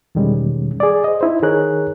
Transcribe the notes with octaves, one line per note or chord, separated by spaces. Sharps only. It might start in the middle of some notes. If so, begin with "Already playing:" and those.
E2 B2 D#3 G3 G#3 C#4
G#4 D5
C5 D#5
D#4 E4 C5
D#3 D#4 G#4 A#4 C#5 F#6